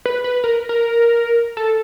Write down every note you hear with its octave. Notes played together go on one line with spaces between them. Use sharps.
B4
B4
A#4
A#4
A4